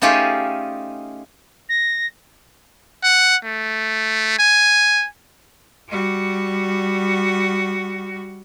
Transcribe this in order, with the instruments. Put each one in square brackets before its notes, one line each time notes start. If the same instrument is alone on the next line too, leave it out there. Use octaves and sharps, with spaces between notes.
[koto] A3 C#4 D#4 F4 G4 G#4
[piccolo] A#6
[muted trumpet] F#5
A3
G#5
[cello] G3 F#4